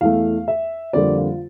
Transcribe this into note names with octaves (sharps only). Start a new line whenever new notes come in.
E2 E3 A3 F5
E5
F2 D3 G3 A#3 D5
F4